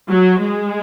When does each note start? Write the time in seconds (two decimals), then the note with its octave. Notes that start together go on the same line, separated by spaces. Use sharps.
0.09 F#3
0.40 G#3